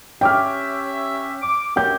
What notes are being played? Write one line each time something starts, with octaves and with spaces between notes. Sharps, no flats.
C#4 G4 E5 G5 D6 F6
D6
F#2 A3 G4 F#5 G5 G6